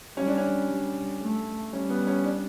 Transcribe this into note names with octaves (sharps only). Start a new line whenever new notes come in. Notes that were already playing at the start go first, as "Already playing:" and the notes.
G3 C#4
D4
C#4
G3
A3
G3 C#4
B3
C#4
D4